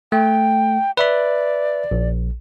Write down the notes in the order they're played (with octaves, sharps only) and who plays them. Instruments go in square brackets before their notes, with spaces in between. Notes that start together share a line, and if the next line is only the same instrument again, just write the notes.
[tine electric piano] A3 [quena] G5
[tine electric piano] B4 E5 B5 [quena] D5
[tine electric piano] A#1